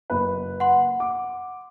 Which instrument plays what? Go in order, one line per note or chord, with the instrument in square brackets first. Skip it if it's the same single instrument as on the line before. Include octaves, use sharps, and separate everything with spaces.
[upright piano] F#1 B4
[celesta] F#5 C6
[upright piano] D6